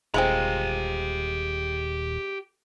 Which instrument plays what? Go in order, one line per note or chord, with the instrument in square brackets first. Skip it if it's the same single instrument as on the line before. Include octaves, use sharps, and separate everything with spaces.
[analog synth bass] D#1 [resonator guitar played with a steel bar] G#3 [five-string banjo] C4 F4 B5 [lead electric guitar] G4 A#5